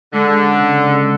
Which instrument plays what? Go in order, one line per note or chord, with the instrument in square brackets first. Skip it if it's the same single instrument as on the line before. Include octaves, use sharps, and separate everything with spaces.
[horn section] D3 [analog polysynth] G#3
[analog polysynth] C#4
C#3
G#3